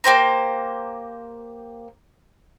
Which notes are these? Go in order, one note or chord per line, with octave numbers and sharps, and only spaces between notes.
A#3 G4 C5 A#5